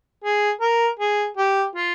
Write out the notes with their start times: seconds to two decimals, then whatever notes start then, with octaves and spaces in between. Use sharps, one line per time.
0.24 G#4
0.61 A#4
0.99 G#4
1.37 G4
1.75 F4